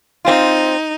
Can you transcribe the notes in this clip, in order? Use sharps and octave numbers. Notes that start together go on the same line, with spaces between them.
C4 D#4 F4